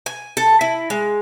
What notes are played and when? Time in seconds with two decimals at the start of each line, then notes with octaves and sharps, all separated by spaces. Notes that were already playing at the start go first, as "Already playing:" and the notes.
0.06 G#5
0.37 A4
0.61 E4
0.90 G#3